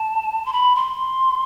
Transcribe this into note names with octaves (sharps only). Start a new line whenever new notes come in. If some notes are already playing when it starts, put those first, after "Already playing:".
Already playing: A5
C6
B5
C6